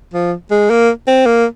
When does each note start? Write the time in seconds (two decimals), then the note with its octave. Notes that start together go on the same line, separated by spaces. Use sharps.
0.14 F3
0.51 G#3
0.70 A#3
1.07 C4
1.26 A#3